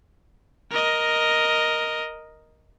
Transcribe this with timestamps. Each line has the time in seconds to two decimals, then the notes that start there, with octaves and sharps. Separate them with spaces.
0.71 A#4 D#5